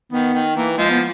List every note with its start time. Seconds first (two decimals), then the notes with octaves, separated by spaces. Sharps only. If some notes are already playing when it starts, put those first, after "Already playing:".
0.12 D#3 B3
0.34 D#3
0.56 E3 A#3
0.77 F3 G#3
0.90 B3